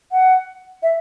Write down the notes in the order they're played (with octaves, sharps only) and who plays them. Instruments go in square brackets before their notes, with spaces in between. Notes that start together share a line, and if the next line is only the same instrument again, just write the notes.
[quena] F#5
E5